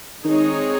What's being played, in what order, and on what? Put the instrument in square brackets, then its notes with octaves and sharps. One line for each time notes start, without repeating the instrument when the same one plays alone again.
[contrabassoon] D#3 [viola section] G#3 C4 D#4 G#4 C#5